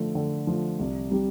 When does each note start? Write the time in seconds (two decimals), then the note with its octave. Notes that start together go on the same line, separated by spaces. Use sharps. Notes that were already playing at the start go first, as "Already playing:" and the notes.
Already playing: D3 F3 A3
0.15 D3
0.47 F3 A3
0.79 C2
1.11 C3 G3